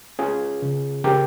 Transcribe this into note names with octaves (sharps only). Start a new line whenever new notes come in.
C#4 F4 G#4
C#3
C#3 G4 A#4